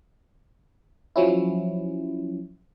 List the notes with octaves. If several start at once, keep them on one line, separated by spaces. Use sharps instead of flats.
F3 F#3 C#4 E4